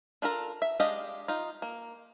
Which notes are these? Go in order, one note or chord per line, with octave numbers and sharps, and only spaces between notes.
D4 F4 A4 A#4
E5
G#3 D4 G4 D#5 F5
D#4 F4
A#3